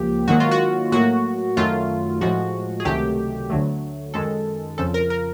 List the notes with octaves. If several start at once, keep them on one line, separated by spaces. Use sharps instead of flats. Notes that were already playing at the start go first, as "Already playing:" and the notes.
Already playing: C#2 C#3 F3 A#3 G4
G#2 D#3 F#3 A#3 F#4
F4
F#4
A2 F#3 A#3 F#4
F#2 D#3 F#3 A3 F4
A2 F3 G#3 F#4
G#4
C#2 C3 D#3 F#3 A3 G4
D2 D3 F#3 A3
F#2 D#3 G#3 A4
F2 C#3 F3 A4
A#4
A#4